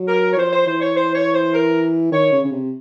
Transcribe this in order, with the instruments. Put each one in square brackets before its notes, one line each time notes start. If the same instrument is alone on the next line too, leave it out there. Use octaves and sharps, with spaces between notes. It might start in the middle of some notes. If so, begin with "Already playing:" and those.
Already playing: [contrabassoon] F#3
[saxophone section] A#4
C#5
[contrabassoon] F3 [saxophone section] C5
[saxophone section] C5
[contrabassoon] E3 [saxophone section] C5
[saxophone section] C#5
C5
C#5
C5
A#4
[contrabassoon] D#3 [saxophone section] C#5
[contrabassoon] C#3
C#3
C3